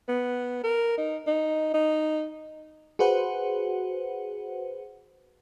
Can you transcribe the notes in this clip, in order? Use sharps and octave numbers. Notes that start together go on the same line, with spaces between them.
B3
A#4
D#4
D#4
D#4
F#4 G#4 B4 C5 F#5